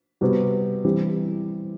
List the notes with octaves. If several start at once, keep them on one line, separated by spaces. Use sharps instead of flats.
C3 G3 B3 F#4
E3 G3 C4 G4